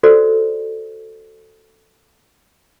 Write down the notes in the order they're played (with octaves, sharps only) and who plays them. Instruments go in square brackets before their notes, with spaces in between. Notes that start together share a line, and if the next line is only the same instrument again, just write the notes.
[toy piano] F#4 A4 C5 D5